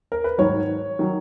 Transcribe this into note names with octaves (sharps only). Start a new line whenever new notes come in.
A#4
B4
G#2 D#3 F#3 C#5
D#3 F#3